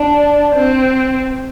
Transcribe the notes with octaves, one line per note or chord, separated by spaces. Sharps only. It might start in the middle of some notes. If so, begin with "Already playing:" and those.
Already playing: D4
C4